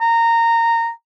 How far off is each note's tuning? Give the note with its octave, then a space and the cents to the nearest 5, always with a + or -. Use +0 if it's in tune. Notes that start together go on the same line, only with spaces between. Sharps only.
A#5 -15